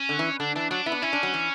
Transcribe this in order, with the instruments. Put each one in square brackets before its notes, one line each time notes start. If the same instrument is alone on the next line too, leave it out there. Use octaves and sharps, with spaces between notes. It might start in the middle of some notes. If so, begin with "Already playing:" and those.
Already playing: [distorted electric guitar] C#4
[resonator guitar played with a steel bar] D3
E3
[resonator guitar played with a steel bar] D3 [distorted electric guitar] D4
[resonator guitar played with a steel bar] E3 [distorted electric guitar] D4
[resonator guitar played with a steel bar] F#3 [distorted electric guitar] D4
[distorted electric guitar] B3 [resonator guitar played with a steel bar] E4
[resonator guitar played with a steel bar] D4
[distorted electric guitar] C#4 [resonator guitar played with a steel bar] E4
[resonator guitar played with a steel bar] D4
F#3
E3